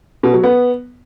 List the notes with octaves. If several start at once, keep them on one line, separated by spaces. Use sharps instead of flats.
B2
F#3
B3